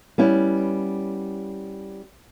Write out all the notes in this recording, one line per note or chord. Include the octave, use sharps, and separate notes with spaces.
G3 B3 C#4 E4